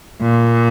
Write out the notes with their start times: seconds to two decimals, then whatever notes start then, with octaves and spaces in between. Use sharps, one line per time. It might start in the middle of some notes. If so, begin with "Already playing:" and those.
0.22 A#2